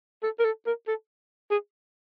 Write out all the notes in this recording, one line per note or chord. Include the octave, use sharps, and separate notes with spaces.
A4
A#4
A4
A#4
A4
G#4